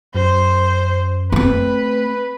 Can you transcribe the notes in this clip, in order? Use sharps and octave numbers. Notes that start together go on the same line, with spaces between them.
F#2 C5
A3 C4 B4